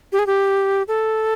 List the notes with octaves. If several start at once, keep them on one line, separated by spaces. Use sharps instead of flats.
G4
G#4
G4
A4